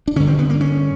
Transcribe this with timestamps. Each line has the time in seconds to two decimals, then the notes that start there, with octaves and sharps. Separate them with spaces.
0.08 D4
0.16 G2 D3 C#4
0.27 C4
0.39 B3
0.50 A#3
0.61 C#4